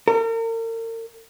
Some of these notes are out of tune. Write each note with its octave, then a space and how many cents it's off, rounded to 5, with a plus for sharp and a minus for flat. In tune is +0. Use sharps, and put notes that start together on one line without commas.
A#4 -40